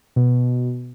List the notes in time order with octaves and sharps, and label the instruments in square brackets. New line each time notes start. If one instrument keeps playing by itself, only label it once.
[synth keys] B2